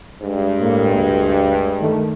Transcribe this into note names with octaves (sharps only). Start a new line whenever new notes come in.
G2 G#3
A2 A#3
D2
D#3 A3